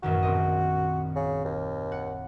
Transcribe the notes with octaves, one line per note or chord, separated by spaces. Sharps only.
A1 F#2 D#3 F#4
A#1 C4 D#5
C#3
D#2
F#5